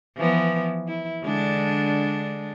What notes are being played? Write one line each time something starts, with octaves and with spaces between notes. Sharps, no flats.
E3 F3 B3
E4
D3 G#3 D4